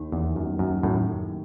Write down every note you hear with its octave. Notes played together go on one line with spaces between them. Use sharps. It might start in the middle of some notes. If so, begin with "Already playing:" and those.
Already playing: D#2 D#3
E2
F#2
F#2
F#2 A2